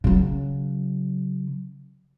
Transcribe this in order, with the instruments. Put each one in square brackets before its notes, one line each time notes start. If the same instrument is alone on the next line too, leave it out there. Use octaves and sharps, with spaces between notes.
[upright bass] C#3 F#3